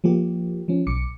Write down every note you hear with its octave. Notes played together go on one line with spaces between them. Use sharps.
F3 A#3 G4
F3 C#4
B1 D6 C#7